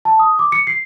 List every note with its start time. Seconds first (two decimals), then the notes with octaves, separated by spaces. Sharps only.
0.05 A5
0.19 D#6
0.39 D6
0.52 C#7
0.67 C7